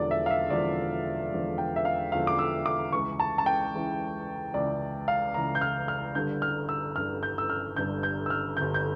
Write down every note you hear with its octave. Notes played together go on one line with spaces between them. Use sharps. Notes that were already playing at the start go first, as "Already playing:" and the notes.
Already playing: E1 E2 D3 F3 D5
E5
F5
E5
E1 E2 D3 F3 D5
E1 E2 D3 F3
G5
E5
F5
E1 E2 D3 F3 F5
D6
E6
D6
C#2 C#3 E3 C#6
A5
A5
G5
C#2 C#3 E3
C#2 C#3 E3 D5
F5
C#2 C#3 E3 A#5
G6
F6
F6
G1 G2 D3 G6
F6
E6
G1 G2 D3 F6
G6
E6
F6
G1 G2 D3 G6
G6
E6
F6
G1 G2 D3 G6
G6